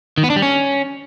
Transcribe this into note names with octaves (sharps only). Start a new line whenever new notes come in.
D#3
B3
D4
G3
C#4